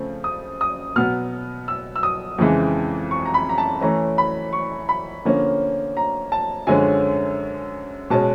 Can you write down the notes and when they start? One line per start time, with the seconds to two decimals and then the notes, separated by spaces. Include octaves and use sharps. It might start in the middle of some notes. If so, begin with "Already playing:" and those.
Already playing: C#3 F3 A3 C4
0.24 D#6
0.61 D#6
0.96 B2 F#3 B3 F6
1.68 E6
1.96 E6
2.03 D#6
2.38 F2 C#3 E3 G#3
3.11 C#6
3.26 A#5
3.34 B5
3.49 A#5
3.58 A5
3.81 E3 A3 C#4 A#5
4.18 B5
4.53 C#6
4.89 B5
5.25 D3 F3 A#3 C#4
5.97 A#5
6.32 A5
6.67 F#2 D3 F3 G#3 C#4 G#5
8.10 B2 G#3 C#4 A5